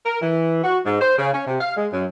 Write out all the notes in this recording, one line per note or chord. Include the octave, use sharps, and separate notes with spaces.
A#4
E3
F#4
G#2
C5
C#3
C#4
C3
F5
G#3
F#2